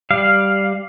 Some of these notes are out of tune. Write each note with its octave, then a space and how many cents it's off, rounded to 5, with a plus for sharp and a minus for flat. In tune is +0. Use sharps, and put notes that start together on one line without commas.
G3 +0 F5 +0